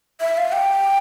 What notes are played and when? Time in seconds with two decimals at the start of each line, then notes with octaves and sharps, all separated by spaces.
0.21 E5
0.38 F5
0.52 G5